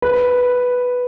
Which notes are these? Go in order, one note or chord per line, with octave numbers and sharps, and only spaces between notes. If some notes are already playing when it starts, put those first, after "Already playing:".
B4